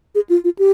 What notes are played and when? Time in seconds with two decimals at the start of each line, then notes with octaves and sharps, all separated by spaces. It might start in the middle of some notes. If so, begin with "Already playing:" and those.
0.15 G#4
0.30 F4
0.44 F4
0.59 G4